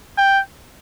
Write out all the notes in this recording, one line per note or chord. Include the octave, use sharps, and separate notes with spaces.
G5